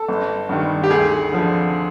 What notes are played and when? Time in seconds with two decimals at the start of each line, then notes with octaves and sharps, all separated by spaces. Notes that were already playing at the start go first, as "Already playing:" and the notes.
Already playing: A4
0.08 G1
0.49 G2 D#3
0.84 G4
0.91 D2 G#4
1.32 D3 F3